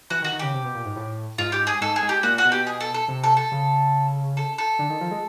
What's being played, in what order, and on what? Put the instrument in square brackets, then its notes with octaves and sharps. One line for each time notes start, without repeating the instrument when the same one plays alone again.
[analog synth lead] E3 [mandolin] F#4
[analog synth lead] D#3
[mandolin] F#4
[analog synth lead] D#3
[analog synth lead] C#3 [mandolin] G4
[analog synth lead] C3
B2
A#2
G#2
A2
[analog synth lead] G#2 [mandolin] F4
[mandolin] G4
G#4
[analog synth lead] G#2 [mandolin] A4
[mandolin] G#4
[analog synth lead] G#2
[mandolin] G4
[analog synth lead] A#2 [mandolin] F#4
[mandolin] F#4
[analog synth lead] B2
[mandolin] G4
G#4
A4
A4
[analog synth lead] C3
[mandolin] A4
A4
[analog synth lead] C#3
[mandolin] A4
A4
[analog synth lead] D3
D#3
F3
G#3